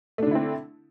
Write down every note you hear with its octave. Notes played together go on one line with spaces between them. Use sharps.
D3 A3 C4 D4 E4